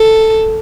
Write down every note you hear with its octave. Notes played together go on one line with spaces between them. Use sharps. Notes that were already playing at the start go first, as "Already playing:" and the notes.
Already playing: A4